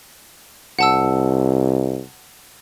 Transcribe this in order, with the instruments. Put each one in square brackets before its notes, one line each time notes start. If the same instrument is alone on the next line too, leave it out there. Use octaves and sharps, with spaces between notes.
[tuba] C2 [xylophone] F#5 A5 E6